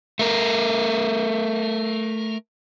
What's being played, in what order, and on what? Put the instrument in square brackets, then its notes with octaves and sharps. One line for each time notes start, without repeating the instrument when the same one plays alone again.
[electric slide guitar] A3 A#4